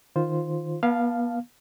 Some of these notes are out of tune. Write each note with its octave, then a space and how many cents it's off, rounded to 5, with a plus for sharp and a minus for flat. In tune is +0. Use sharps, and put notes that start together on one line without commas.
D#3 +0 F4 +0 C5 +0
B3 -40 F5 +0 A5 +0